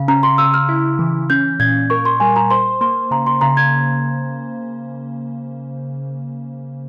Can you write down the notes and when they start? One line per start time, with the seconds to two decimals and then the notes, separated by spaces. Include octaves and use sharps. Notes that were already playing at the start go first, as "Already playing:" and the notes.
Already playing: C#3
0.08 C#4 A#5
0.23 C6
0.38 C#3 E6
0.54 F6
0.69 E4
0.99 E3
1.30 C#4 G6
1.60 A#2 G#6
1.90 A#4 C#6
2.05 C6
2.20 G3 G#5
2.36 A#5
2.50 C5 C6
2.81 A#3 C6
3.11 C#3 A#5
3.27 C6
3.41 C#3 A#5
3.57 G#6